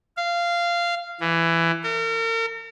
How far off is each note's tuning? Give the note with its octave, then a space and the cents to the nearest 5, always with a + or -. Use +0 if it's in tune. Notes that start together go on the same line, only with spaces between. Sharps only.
F5 -15
E3 +15
A#4 -40